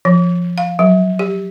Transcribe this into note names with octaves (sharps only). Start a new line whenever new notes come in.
F3
F5
F#3
G4